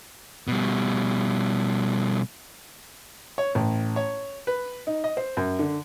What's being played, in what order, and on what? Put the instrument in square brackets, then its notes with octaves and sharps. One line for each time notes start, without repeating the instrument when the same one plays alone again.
[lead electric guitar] B2 G3
[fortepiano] C#5
A1
C#5
B4
D#4
D#5
C5
F#2
D3